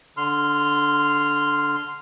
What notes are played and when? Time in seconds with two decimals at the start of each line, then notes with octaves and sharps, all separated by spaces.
0.17 D3 C6 F6